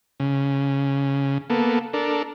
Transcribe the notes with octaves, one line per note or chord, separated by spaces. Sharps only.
C#3
A#3 B3 A4
D4 A4 A#4